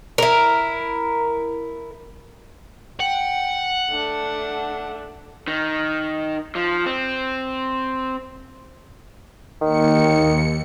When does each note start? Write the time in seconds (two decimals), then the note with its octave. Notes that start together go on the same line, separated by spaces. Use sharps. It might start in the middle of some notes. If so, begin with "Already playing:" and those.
0.18 E4 A#4
3.00 F#5 G5
3.90 A3 D4
5.48 D#3
6.55 F3
6.86 C4
9.61 D#2 D#3 C#7